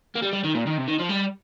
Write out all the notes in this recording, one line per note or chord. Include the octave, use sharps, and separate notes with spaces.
A#3
G3
G3
D#3
A#2
D#3
C3
D#3
F3
G3